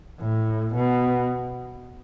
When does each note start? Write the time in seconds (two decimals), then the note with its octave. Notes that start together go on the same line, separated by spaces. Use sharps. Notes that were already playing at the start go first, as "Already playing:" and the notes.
0.20 A2
0.74 B2